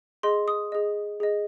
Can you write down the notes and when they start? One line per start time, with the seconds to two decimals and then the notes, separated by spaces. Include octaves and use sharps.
0.23 G#4 D#5 C6
0.48 D#6
0.72 G#4 D#5
1.20 G#4 D#5